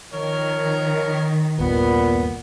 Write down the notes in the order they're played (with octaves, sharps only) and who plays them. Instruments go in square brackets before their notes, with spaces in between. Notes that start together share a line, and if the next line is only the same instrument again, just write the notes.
[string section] D#3 [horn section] F3 A#4 C#5
[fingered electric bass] G1 D#2 [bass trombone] A#2 [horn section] B3